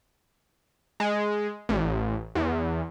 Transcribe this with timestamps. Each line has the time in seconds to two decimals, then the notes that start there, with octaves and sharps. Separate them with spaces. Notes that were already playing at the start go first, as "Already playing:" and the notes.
1.00 G#3
1.69 A1
2.35 E2